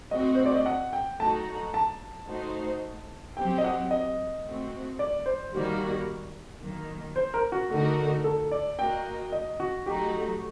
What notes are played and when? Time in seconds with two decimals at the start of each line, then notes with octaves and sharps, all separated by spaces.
0.11 A3 C4 F#4 D#5
0.35 C5
0.46 D5
0.56 D#5
0.66 F#5
0.93 G5
1.20 F#3 A3 D#4 F#4 A5
1.74 A5
2.28 A3 D#4 F#4 C5
3.37 F#3 C4 G4 G5
3.58 D#5
3.64 F#5
3.91 D#5
4.45 A3 C4 F#4
4.99 D5
5.26 C5
5.53 D#3 G3 A#3 F#4
6.61 D#3 F#3 A#3
7.16 C5
7.34 A#4
7.52 F#4
7.70 D3 A3 D#4 F#4 A#4
8.24 A4
8.51 D5
8.78 A#3 F#4 A#4 D#5 G5
9.32 D#5
9.60 F#4
9.86 F#3 A3 D#4 F#4 G4